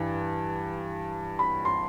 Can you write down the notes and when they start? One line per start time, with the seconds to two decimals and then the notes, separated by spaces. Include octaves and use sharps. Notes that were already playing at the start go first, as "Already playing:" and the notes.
Already playing: G2 E3
1.39 B5
1.65 C6